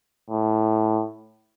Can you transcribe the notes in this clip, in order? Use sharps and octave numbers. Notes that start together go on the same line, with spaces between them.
A2